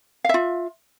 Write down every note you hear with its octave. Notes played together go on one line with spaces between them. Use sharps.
F4 E5 F5